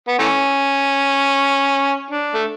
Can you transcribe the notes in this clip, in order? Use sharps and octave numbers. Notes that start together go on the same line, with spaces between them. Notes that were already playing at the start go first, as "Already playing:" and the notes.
B3
E3 A3 C#4
D4
A3